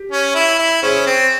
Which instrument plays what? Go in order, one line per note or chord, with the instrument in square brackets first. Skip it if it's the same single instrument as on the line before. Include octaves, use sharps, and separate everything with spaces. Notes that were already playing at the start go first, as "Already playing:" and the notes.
Already playing: [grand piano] G4
[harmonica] C#4
E4
E4
[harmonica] C#4 [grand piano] G#4 C5
[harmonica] C4